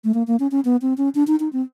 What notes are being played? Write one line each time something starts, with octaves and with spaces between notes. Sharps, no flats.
A3
A#3
A#3
C#4
C#4
B3
C4
C#4
D4
D#4
D#4
C4